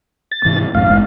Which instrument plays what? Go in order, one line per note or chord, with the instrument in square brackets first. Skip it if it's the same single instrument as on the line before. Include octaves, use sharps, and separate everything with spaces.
[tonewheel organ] A6
[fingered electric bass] G#2 C3 E3
[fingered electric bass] B1 F#2 A2 [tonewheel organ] F5
[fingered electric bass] F#1 G#3